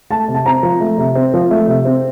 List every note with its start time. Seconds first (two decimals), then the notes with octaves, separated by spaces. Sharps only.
0.10 A3 A5
0.28 C3
0.35 A5
0.46 C4 A#5
0.63 F3
0.81 A3
0.98 C3
1.15 C4
1.34 F3
1.51 A3
1.68 C3
1.85 C4